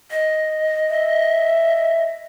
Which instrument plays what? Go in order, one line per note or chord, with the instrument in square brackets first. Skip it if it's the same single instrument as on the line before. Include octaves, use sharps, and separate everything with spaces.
[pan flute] D#5
[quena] E5